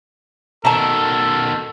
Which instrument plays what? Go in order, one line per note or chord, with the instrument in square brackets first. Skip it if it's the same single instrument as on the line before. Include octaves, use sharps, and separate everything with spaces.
[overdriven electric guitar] B2 D#3 [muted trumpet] A4 [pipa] A5 A#5